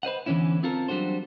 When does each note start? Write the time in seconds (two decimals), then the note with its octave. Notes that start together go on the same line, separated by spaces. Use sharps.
0.03 B4 C5 D#5 F#5
0.26 E2 D3 E3 F3 C#4 E4
0.63 C4 F4 A4 A#4
0.88 F#3 G3 D4 F#4 C5